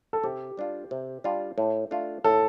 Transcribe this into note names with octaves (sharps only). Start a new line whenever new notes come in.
A4
C3 G4
G3 D4 F4
C3
G3 D4 F4
A2
A3 D4 F4
A2 A4